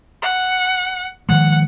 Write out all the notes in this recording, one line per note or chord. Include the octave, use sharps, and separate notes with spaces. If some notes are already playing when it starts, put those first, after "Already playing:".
F#5
D#3 F3 G#3 F#5